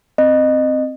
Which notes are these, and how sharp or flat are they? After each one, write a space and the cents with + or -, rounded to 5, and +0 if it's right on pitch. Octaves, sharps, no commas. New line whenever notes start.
C4 +0 D#5 -20